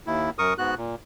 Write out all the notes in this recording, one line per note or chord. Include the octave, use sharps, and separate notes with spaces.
D#2 E4
F#2 A#4 C#6 D#6
G#2 B3 F#4 F#6
A#2